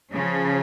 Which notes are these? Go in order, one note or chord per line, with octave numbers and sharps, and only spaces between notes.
C#3 F3